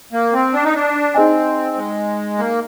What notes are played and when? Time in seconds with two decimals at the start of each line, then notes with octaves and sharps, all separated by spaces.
0.13 A#3
0.33 C4
0.54 D4
0.64 D#4
0.75 D4
1.14 C4 D#4 G#4 D#5 G#5
1.76 G#3
2.38 A#3